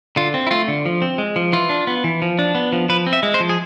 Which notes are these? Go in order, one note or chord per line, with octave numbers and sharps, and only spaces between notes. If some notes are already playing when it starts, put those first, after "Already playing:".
D3 F4
C4
E4
A3 F4
D3
F3
C4
G#3
F3
E3 F4
D4
B3
E3
F3
D4
B3
F3
F3 B4
C4
E5
G#3
C5
F3
G#4